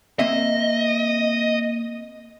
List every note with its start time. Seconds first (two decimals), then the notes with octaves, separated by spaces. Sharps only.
0.19 A#3 C4 D#5 E5